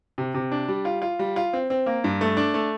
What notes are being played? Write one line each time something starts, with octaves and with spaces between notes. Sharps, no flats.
C3
C3
D4
G3
F4
F4
G3
F4
C4
C4
A#3
G2
A3
D4
A3